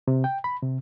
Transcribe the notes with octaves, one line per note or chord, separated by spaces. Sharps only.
C3
G5
B5
C3